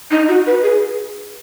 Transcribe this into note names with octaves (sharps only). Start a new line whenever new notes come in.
D#4
F#4
B4
G#4